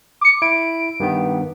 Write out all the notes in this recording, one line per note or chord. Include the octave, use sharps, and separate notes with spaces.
D6 C#7
E4 D7
G2 D#3 B3